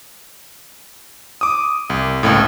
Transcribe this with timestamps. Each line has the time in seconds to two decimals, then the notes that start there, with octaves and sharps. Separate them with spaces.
1.41 D6 D#6
1.90 C2
2.23 G1 C#2 A2